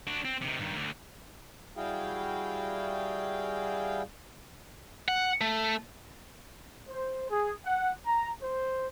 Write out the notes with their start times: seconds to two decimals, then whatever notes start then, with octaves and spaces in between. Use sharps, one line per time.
0.07 D4 F#4
0.25 C4
0.42 C3 D#3
0.59 G2 D#3
0.76 D2 D3
1.77 G3 E4 F#4 G#4 F5 G5
5.08 F#5
5.41 A3
6.88 C5
7.30 G#4
7.65 F#5
8.06 A#5
8.42 C5